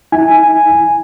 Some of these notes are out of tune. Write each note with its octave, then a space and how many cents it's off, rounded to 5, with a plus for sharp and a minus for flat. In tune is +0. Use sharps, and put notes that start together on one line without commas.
E4 -30 G#5 -5